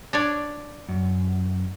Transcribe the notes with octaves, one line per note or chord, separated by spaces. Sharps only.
D4 C#5 D5
F#2